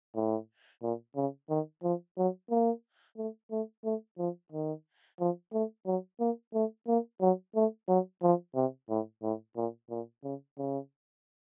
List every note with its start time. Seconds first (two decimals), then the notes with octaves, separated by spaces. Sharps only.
0.16 A2
0.82 A#2
1.16 C#3
1.50 D#3
1.83 F3
2.18 F#3
2.50 A#3
3.18 A3
3.51 A3
3.85 A3
4.18 F3
4.52 D#3
5.20 F3
5.53 A3
5.86 F#3
6.20 A#3
6.54 A3
6.88 A#3
7.21 F#3
7.55 A3
7.88 F#3
8.23 F3
8.55 C3
8.90 A2
9.23 A2
9.56 A#2
9.90 A#2
10.24 C#3
10.58 C#3